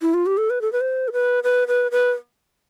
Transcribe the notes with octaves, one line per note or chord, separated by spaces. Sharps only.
E4
F4
G4
A4
B4
A4
B4
C5
A4
B4
B4
B4
B4